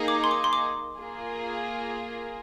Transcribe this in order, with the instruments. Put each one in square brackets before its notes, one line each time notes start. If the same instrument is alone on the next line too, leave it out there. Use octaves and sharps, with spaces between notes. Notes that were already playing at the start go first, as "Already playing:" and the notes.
Already playing: [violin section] A#3 D#4 G#4
[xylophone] D6
C6
D6
C6
D6
[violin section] A#3 F4 G#4